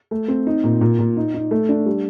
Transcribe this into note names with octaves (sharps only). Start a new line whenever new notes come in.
A3
C4
D#4
A#2
A#2
A#2
D#4
D#4
A3
D4
G3